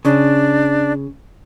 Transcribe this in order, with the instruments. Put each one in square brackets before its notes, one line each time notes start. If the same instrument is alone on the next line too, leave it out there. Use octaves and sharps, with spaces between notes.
[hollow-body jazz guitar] C#3 [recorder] D4